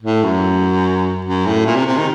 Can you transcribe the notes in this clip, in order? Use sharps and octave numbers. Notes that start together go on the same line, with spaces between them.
A2
F#2
F#2
A2
A#2
C3
C3
D#3